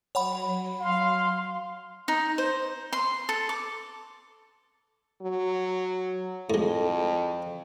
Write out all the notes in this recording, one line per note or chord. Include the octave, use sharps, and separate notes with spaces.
F#3 C#5 F#5 B5
F5 C6
D#4
C5
C6
A4
D6
F#3
F2 A2 G#3